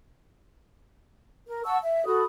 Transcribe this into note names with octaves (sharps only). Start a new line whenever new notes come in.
A#4
F#5 A5 C#6 E6
E5
F#4 A4 B5 D#6